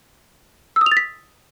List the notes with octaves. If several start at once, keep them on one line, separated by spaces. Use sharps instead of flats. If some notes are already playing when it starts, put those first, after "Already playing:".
E6
D#6
F7
A6
B6